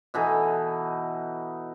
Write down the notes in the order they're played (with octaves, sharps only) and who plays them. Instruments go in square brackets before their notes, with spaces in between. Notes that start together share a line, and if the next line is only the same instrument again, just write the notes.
[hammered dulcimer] B2 E3 D#4 A4